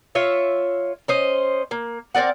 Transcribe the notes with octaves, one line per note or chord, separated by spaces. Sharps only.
F4 C#5 E5
C#4 C5 D#5
A#3
C4 A#4 D5 F#5